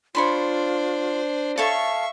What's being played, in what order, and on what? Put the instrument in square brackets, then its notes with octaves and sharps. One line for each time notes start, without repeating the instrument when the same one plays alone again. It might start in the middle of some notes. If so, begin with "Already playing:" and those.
[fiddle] D4 C5 [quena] F4 [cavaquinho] C#5 B5 C6
[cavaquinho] A4 C#5 A5 [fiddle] E5 C#6 [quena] F5